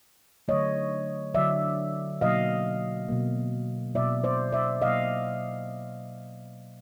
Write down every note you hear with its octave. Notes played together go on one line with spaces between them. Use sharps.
D3 F#3 A3 C#5 D#5
D3 F#3 A3 D5 E5
B2 F#3 A#3 D#5 F5
B2 F#3 A#3
B2 F#3 A#3 D5 E5
C5 D5
D5 E5
B2 F#3 A#3 D#5 F5